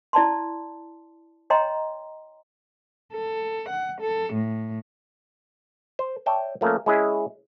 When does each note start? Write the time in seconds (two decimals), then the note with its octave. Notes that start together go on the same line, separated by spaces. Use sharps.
0.13 E4 D5 A5 C6
1.50 C#5 D#5 G5 A#5 C6
3.12 A4
3.70 F#5
4.01 A4
4.33 A2
5.99 C5
6.26 C#5 D5 E5 G5 A5
6.61 F3 A3 A#3 C#4
6.86 G#3 C#4 E4 G#4 D#5 E5